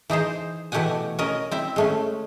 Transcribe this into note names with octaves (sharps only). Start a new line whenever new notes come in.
E3 D#4 G#4 C5
B2 E3 A3 G4 F#5 G#5
C#4 A#4 D#5
C4 E4 E5
G#3 A3 C#4